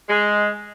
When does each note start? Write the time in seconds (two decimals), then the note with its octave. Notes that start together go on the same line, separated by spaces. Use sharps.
0.09 G#3